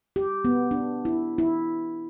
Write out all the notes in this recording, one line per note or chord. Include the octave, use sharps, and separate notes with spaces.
G4
B3
D4
E4
E4